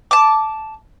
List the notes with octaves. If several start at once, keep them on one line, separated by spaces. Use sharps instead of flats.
A5 D6